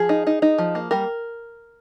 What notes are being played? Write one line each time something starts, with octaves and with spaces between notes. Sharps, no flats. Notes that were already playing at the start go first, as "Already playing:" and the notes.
Already playing: F3 G#4
D#4
D#4
D#4
F3
A#3
G3 A#4